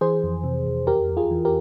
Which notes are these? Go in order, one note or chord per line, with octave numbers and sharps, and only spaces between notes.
E3 G#4 C5
F2
C3
F2
E2 G4 A#4
E2
F4 G#4
E3
G4 A#4